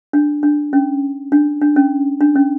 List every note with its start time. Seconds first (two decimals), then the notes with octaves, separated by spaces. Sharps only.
0.13 D4
0.43 D4
0.73 C#4
1.32 D4
1.61 D4
1.76 C#4
2.21 D4
2.36 C#4